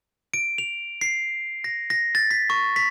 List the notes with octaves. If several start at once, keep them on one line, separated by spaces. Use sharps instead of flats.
D7
F7
C7
A#6
A#6
A6
B6
C#6
B6